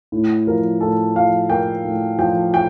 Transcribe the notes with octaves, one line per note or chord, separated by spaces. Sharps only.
A2
F3 A#4
A2 A4
F3 F5
A#3 G5
A2
F3 G5
F3 G5